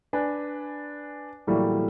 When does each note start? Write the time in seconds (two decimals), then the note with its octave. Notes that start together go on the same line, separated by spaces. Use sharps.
0.13 D4 B4 G#5
1.47 A2 D3 E3 F#3 G3 A#3